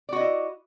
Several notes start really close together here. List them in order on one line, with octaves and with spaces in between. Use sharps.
D5 F#4 D#5 E4